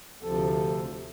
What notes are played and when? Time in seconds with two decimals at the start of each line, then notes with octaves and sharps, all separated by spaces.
0.22 D2 C3 F3 A4